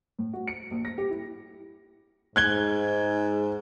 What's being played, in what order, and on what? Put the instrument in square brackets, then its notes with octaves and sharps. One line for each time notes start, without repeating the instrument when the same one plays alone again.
[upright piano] A2
F#4
C#7
A#1
A#6
G4
E4
[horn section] G#2 [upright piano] F#6 G#6 G7